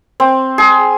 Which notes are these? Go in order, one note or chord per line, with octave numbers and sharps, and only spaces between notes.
C4
G#4